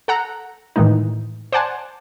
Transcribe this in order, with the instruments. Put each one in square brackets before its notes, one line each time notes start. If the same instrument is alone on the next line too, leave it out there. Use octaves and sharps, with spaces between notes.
[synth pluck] A4 F#5 A#5
A2 D#3 E3 G#3 D#4
C5 D5 F#5 G#5 A5